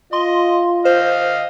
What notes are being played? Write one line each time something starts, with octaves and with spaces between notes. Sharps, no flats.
F4 D#5 C6
C5 D#5 F5